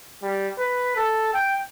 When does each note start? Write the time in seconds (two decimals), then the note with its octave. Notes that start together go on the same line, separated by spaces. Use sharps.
0.23 G3
0.58 B4
0.96 A4
1.34 G5